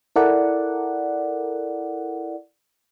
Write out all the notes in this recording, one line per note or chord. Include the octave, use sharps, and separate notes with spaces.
E4 A4 A#4 D5 F#5